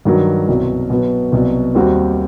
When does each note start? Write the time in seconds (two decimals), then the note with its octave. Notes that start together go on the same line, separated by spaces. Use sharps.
0.05 G2 D#3 F#3
0.48 C2 B2 F#3
0.90 B2 F#3 B3
1.32 C2 B2 F#3
1.75 D#2 D#3 G3 C4 F#4